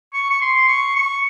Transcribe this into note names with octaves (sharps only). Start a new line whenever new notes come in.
C#6
C#6
C6
C#6
C#6